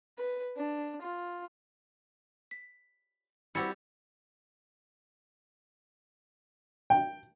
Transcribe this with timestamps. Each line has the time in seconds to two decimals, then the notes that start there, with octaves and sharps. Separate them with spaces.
0.18 B4
0.56 D4
1.01 F4
2.51 B6
3.55 G3 C4 E4 F#4 G4 E6 A6 C#7
6.90 G5